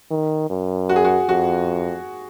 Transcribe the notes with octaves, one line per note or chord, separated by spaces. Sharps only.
D#3
F#2
F#4
G#4
F#4
F2 F#4